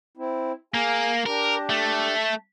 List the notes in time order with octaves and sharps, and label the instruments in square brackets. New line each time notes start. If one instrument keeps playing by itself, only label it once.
[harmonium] C4 E4
[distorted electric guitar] A#3 [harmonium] G#4 F5 G#5
[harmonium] D4 G4 [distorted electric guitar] A#4
[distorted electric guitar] A3